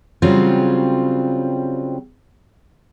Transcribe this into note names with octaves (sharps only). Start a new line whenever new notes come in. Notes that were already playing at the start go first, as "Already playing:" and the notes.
C#3 F#3 G3 C4 F4